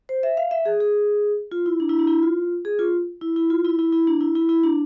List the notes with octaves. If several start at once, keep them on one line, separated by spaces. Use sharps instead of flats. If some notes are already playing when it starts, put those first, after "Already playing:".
C5
E5
F5
E5
G#4
G#4
F4
E4
D4
E4
D4
E4
F4
G#4
F4
E4
E4
F4
E4
E4
E4
D4
E4
E4
E4
D4